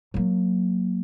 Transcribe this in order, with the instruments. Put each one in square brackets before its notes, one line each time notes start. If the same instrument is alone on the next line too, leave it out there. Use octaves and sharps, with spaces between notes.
[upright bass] F#3 A#3